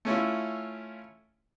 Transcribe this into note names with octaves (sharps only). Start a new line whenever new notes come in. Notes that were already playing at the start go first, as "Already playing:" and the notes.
A3 C#4 E4 F4